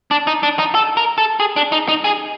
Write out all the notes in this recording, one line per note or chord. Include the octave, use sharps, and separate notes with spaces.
D4
D#4
D4
D#4
A4
A#4
A4
G#4
D4
D#4
D#4
G#4